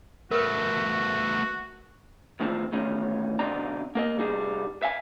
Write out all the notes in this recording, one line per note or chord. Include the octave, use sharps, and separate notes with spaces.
A3 B3 F#4 A#4 B4
E2 A2 D#3 F3 C4
E2 A2 D#3 C#4
B1 D3 C4 D#4 D5 A#5
A#3 A#4 D#5
C3 G3 D#4 G#4
E5 F5 G#5